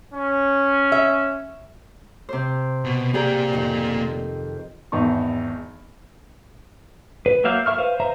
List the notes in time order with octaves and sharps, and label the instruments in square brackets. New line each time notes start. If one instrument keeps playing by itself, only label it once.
[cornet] C#4
[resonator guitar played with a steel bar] E5
[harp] C3 C5
[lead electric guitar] B2
[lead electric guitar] A#3 D5 [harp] G4 G#4 A#4
[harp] F2 D#3
[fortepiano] G#1 E2 D#4 C#6
[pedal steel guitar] B4
F#3 A#3 E5 F5 G6
A#4 E5 C#6 F6
B4 C5 F5
B4 C5 E5 F5 A#5